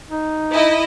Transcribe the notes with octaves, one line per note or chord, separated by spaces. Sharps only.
D#4
E4 D#5